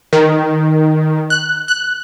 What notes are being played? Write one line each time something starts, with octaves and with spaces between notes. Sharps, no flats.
D#3
F#6
F#6